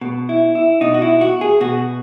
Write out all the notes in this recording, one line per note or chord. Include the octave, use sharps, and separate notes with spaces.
B2
E4
E4
B2 D#4
F#4
E4
F#4
G#4
B2 F#4